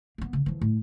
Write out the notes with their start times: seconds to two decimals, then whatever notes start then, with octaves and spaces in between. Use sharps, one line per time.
0.18 A#3 B3
0.33 C#3
0.46 E3 F3
0.61 A2